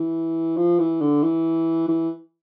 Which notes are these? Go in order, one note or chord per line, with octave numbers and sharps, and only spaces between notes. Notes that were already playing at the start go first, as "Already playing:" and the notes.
Already playing: E3
F3
E3
D3
E3
E3